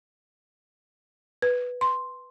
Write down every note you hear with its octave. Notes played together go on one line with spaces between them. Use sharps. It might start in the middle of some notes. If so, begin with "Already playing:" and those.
B4
C6